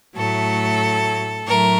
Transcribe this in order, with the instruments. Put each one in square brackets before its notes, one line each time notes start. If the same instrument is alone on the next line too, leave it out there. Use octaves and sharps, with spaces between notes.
[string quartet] A2 F#3 A3 A4
A2 F#3 A3 A#4